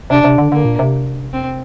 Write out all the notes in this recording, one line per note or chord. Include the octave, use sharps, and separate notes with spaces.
C3 D4
C3
D3
D3 A#3
A#2
C3
C4